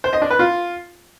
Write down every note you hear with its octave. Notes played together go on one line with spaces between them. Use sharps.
C5
D#5
D4
B4
F4